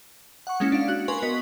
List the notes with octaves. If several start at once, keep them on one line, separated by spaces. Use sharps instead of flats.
F#5 C#6
G#3 A#3 C#4 E4
D4 F5
F#4 F#6
A#4 B4 G#5 C6 C#6
B3 F#4 A#4 D#5 B6